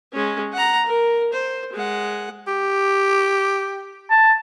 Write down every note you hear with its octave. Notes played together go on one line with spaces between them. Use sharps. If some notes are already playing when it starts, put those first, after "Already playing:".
G#3 C#4
F#5 A#5
A#4
C5
G#3 F#5
G4
A5